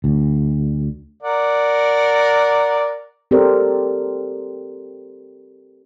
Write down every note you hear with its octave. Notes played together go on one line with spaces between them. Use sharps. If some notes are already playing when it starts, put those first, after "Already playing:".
D2
A#4 D5 F#5
C4 G4 A4 A#4 C5 D5